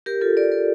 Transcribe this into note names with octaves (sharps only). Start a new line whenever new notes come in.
G4 A#4
F4 A4
A#4 D5
A#4 D5